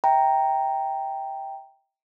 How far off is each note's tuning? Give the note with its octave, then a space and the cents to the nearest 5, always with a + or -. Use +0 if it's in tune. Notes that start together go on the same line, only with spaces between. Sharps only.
E5 -15 G5 +0 A#5 +0